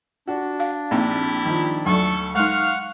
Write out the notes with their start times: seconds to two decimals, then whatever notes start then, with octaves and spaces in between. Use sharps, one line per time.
0.28 D4 F#4
0.60 F5
0.91 A#1 A#3 C4 D#4 E4 G4
1.45 D#3 F3
1.86 D2 F#3 A4 C#6
2.35 G#3 D#4 F5 F#5 C#6 F6 F#6